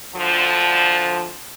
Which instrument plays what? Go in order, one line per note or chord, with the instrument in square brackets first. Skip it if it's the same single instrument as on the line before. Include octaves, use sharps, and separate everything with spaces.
[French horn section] D2 D3 F3